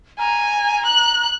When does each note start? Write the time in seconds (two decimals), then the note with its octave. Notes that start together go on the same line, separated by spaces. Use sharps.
0.19 G#5 A#5
0.86 F#6